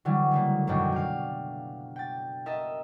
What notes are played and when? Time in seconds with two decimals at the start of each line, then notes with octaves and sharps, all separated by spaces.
0.05 D3 E3 F#3 G3
0.31 C#3 A3 A#3
0.67 G#1 F#2 B2 D4 G5
0.92 F5 G5
1.96 G5 A6
2.46 A#4 D#5 E5 A5